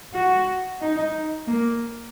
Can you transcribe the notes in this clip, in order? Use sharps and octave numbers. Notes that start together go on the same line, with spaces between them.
F#4
D#4
A#3